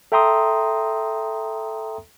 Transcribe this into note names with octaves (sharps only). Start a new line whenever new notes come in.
A4 E5 G5 A#5 C6 D#6